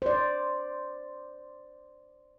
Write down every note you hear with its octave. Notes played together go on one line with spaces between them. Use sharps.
C5 D5